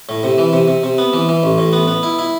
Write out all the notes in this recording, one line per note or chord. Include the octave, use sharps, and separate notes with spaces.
A2
C3
E3
C3
C3
C3
B3
E3
E3
A1
A2
B3
B3
E4
E4